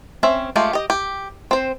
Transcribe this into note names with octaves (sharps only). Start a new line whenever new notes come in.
C4 C#4 E5
G#3 A3 F4 G4
G4 D#5
G4
C4 C5